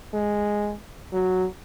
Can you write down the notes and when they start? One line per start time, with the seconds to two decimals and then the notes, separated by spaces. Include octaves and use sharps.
0.13 G#3
1.14 F#3